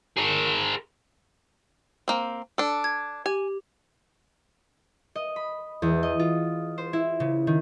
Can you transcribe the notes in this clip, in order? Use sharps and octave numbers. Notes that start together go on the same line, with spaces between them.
G#4 A#4
A#3 C4
D4 A4
G#6
G4 G#5
D#5
B5
E2
D#5
F4
C5
E4
C#3
D#3